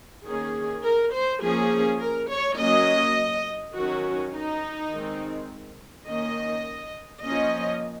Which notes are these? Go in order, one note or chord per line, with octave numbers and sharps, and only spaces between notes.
D#3 A#3 C#4 G#4
A#4
C5
F3 A#3 C#4 G#4
A#4
C#5
F#3 A#3 C#4 D#5
D#3 F#3 C#4 F#4
D#4
D#3 G#3 C4
D#3 A#3 C#4 D#5
F3 A#3 C#4 D#5